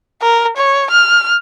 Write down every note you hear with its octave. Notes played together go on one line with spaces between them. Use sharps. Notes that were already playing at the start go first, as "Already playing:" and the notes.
A#4
C#5
F6